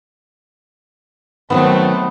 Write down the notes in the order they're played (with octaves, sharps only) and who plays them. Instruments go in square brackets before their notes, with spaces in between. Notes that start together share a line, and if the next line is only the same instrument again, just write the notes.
[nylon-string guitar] D#3 E3 F#3 [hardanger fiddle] A3 C4 [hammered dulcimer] B3